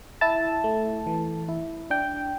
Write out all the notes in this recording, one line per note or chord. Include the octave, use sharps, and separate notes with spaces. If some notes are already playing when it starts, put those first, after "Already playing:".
E4 A5
A3
E3
E4
D4 G5